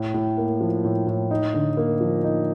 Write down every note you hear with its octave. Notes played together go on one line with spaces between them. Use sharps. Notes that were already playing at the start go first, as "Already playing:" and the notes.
Already playing: A2
A2
A#3
F3
A2
A2
D#4
D3
A#3
F3
D#4